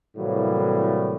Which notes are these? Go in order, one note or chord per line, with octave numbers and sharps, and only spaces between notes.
A2 C3 E3 F#3 G3 A#3